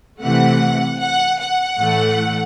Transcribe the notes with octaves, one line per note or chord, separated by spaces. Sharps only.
C3 E3 A3 F#5
F#5
F#5
A2 E3 A3